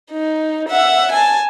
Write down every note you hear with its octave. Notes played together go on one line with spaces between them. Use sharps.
D#4
E5 F#5
G#5 A5